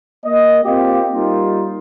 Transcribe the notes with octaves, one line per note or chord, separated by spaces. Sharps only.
A#3 D#5
A#3 C4 F4 G4
G3 A#3 D#4 F4